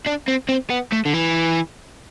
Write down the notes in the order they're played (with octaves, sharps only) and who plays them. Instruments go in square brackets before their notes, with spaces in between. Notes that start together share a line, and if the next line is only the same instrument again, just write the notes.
[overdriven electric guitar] D4
C4
C4
B3
A3
D3
E3